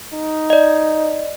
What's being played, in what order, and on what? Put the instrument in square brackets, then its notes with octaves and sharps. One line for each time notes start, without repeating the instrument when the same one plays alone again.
[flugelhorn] D#4
[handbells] D5 D#5